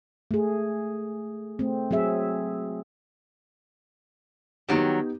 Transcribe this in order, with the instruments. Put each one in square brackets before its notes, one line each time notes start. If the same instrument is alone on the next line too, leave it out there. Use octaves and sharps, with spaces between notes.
[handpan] A3 G#4
A3 C4
F#3 C4 G#4 E5
[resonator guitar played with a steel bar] D#3 F#3 G3 [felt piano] B3 D#4 G4